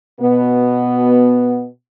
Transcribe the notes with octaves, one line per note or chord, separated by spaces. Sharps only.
B2 B3